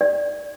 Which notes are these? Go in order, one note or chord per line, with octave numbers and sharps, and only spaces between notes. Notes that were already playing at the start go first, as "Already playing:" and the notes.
D5